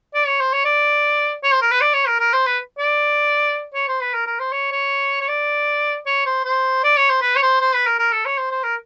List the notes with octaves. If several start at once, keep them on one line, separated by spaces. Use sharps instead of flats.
D5
C#5
C5
C#5
D5
C#5
C5
A#4
B4
D5
C#5
A#4
A#4
C5
B4
D5
C#5
C5
B4
A#4
A#4
C5
C#5
C#5
C#5
D5
C#5
C5
C5
D5
C#5
C5
B4
C#5
C5
C5
B4
A#4
A#4
A4
C#5
C5
C5
A#4